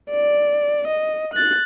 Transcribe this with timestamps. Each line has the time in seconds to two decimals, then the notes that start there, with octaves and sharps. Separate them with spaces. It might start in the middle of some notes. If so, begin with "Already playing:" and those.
0.11 D5
0.87 D#5
1.34 F#6 A6